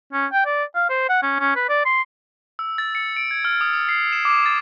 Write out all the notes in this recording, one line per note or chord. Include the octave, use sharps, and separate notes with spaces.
C#4
G5
D5
F5
C5
F#5
C#4
C#4
B4
D5
C6
E6
A6
C#7
D7
G#6
F6
D#6
D#6
C7
E7
D6
A6